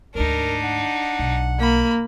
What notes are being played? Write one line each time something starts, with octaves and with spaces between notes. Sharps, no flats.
D2 G#2 D4 D#4 A#4
F#5
B1
A#3 B5